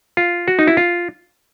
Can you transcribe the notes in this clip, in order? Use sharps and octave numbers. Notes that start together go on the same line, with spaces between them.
F4
F#4
D#4
E4
F4